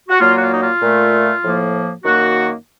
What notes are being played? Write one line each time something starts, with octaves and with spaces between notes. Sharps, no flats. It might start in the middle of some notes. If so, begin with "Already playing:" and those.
F#4
A#2 F#3 A#3 F4
F#4
F4
D#4
F4
A#2 A3
A2 F3 A#3
F#2 D#3 A#3 F#4